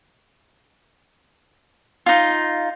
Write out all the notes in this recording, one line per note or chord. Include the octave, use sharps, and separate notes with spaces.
D#4 F4